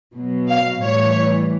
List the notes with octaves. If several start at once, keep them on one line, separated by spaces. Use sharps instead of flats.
B2 F#3
F5
A2 E3 G3 C#5